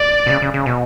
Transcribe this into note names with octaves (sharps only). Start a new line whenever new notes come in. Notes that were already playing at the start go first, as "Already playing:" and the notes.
Already playing: D5
B2
C#3
C#3
C#3
B2